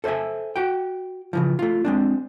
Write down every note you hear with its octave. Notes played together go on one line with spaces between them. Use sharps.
A4 C5 D5 E5 G#5
F#4 G5
C#3 E3 F3
A3 F4
G#3 C4 D4